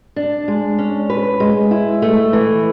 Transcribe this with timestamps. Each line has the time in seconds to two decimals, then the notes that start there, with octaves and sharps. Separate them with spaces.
0.16 D4
0.48 G#3
0.79 C#4
1.10 B4
1.40 G#3
1.71 E4
2.02 A3
2.33 E3